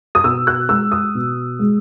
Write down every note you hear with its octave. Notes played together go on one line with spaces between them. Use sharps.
D#6
B2 E6
F#6
G#3 E6
D#6
B2
G#3